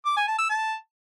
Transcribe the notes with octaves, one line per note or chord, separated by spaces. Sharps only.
D6
G#5
A5
E6
A5